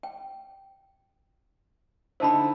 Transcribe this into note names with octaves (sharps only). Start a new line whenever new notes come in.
G5
D3 D#4 E4 C5 A5 B5